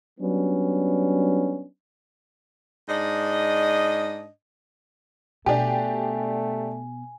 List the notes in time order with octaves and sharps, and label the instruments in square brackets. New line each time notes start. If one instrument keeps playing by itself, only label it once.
[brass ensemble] F#3 G3 B3 C#4 D4
[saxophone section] G#2 D4 D#5
[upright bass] B2 [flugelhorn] A3 [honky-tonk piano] D4 G4 [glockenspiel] G#5